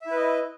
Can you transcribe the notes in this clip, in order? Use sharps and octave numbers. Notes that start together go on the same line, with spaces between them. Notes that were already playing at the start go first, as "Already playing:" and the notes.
E4 B4 D#5 E5